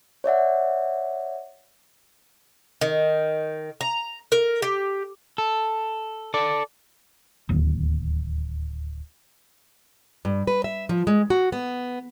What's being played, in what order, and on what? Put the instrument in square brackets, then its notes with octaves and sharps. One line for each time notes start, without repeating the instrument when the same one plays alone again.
[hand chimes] C#5 D5 E5 F#5
[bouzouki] D#3
A#5
A#4
G4
[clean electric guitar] A4
A4 D5
[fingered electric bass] D1 D#2
[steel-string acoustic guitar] G2
B4
E5
F3
G#3
F#4
B3